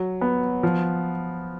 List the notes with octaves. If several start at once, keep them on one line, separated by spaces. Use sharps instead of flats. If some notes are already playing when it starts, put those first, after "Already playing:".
Already playing: F#3
B3
F3